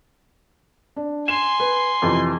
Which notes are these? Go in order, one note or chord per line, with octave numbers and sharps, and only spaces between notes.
D4
G#5 C6 E7
B4
F2 C3 E3